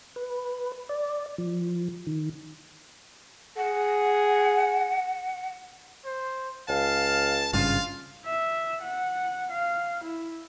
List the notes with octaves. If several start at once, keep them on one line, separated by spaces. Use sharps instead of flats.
B4
D5
F3
D#3
G#4 F#5
C5
C#2 F5 A5
G#1 G2 C#3 F4 F5
E5
F#5
F5
E4